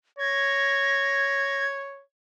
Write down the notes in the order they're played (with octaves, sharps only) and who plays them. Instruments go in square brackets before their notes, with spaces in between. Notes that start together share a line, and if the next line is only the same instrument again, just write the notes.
[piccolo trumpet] C#5 [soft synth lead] G#6 [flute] A#6